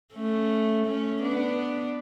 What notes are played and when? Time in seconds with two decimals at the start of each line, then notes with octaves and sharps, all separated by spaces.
0.14 A3 C#4
0.86 A3 C#4
1.22 B3 D4